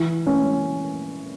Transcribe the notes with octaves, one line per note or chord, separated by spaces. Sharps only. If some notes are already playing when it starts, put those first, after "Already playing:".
Already playing: E3
C#4